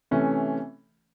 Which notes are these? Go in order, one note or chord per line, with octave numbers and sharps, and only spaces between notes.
C3 E3 A3 C#4